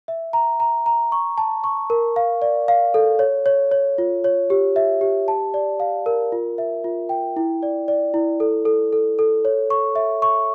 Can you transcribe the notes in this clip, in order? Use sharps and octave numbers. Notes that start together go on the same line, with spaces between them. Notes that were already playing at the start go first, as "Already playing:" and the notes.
E5
A#5
A#5
A#5
C#6
A5
C#6
A#4
F5
D5
F5
A4
C#5
C#5
C#5
F4
C#5
G4
E5
G4
A5
D5
F5
A#4
F4
E5
F4
G5
E4
D5
D5
E4
A4
A4
A4
A4
C#5
C#6
E5
C#6